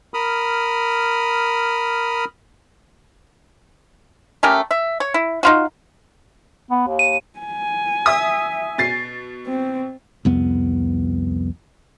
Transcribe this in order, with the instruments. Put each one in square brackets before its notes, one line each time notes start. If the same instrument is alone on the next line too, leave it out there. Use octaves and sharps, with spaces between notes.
[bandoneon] A#4 B5 D#6 F6
[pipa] A3 C#4 G4 A#4
E5
C#5
E4
D#4 F4 F#4
[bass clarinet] B3
D#2
[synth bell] D#7
[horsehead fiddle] G#5
[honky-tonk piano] E5 D#6
B2 A6 C7
[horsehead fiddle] C4
[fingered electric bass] C2 F2 B3